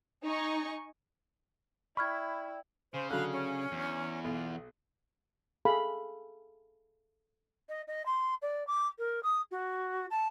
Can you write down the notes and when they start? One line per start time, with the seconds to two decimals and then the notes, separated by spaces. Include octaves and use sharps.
0.25 D#4 G#5 C#6
1.97 E4 D5 G5 B5 C#6 F6 G#6
2.94 C#3 C5
3.10 D3 F#3 F5 B5 F#6
3.32 C#4
3.72 E2
4.24 B1 F4
5.65 G#4 A4 F5 B5
7.69 D#5
7.87 D#5
8.05 C6
8.41 D5
8.67 D6
8.98 A#4
9.23 D#6
9.51 F#4
10.10 A5